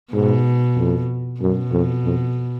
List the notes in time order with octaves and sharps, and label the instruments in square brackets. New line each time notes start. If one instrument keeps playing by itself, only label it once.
[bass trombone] G#2 [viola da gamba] B2
[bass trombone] F2
[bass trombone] F#2 [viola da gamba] B2
[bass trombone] F2
F2